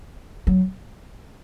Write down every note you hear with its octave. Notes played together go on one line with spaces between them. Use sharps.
F#3